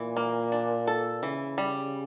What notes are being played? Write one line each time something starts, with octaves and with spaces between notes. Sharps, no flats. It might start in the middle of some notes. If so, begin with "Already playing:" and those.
Already playing: A#2 E3
A#3
D4
A4
C#3 E3
G3